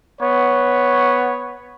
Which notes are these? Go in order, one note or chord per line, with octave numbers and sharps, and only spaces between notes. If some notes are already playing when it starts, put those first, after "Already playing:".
B3 C#5